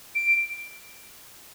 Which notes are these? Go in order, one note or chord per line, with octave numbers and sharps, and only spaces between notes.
D7